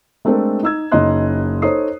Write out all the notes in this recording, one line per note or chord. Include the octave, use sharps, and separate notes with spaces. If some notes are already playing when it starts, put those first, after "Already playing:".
G#3 A3 C4 D4 A4 A#4
D#4 E6 G#6
F#1 C#4 D#4 D#5 C6 F#6
D#4 A4 C5 C#5 D#6 C7